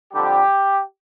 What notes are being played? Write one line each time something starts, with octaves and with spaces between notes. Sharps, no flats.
F2 D3 G3 G4